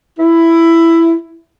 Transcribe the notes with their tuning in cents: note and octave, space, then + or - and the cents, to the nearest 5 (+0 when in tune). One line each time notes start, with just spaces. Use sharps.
E4 +10